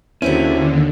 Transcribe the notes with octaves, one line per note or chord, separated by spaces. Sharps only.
D#2 D3 F#3 C4 C#4 E4